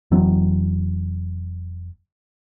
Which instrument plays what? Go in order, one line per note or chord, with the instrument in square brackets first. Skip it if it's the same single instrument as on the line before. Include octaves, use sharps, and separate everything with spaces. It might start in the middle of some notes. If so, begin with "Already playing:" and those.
[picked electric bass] F1 E3 F#3 C4